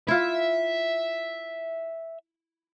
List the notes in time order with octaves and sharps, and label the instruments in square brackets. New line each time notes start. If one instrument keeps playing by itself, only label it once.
[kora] E4 F4 [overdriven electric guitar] E5